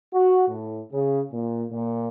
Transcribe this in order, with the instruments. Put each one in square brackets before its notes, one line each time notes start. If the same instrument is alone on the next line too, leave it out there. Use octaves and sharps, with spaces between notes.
[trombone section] F#4
A2
C#3
A#2
A#2